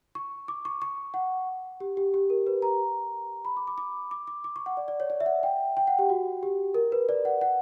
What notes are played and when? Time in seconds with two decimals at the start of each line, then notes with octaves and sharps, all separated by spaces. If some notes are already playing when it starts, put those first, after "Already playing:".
0.15 C#6
0.48 D6
0.65 C#6
0.82 C#6
1.14 F#5
1.80 G4
1.97 G4
2.14 G4
2.30 A#4
2.47 B4
2.62 A#5
3.45 B5
3.57 D6
3.67 D6
3.78 D6
4.11 D6
4.27 D6
4.44 D6
4.56 C#6
4.66 F#5
4.77 D5
4.88 D5
5.00 C#5
5.10 D5
5.20 E5
5.26 F#5
5.43 G5
5.77 G5
5.87 F#5
5.99 G4
6.09 F#4
6.43 G4
6.74 A#4
6.92 B4
7.09 D5
7.25 F#5
7.41 F#5